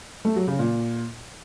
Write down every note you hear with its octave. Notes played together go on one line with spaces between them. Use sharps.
A3
F#3
C#3
A#2